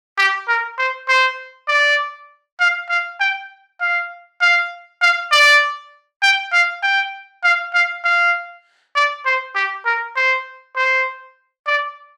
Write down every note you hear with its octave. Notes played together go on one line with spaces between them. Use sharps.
G4
A#4
C5
C5
D5
F5
F5
G5
F5
F5
F5
D5
G5
F5
G5
F5
F5
F5
D5
C5
G4
A#4
C5
C5
D5